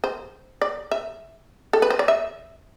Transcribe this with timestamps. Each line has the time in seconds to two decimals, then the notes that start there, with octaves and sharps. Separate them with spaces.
0.04 C5
0.62 D5
0.91 E5
1.73 A4
1.82 B4
1.90 C5
1.99 D5
2.08 E5